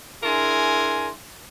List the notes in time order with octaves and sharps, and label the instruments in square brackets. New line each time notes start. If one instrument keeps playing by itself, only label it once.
[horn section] D4 E4 G#4 A#4 G#5 C6